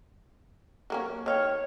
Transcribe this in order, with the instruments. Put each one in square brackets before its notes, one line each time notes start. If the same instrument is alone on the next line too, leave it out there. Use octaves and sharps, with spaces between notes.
[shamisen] F#3 A#3 C#4
[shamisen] D#3 F5 G5 [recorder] C#5